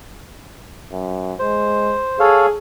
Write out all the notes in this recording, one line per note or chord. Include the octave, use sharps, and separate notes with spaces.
F#2
G#3 C5
G#4 A4 C#5 F5